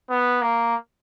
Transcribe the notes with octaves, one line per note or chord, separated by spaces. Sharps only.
B3
A#3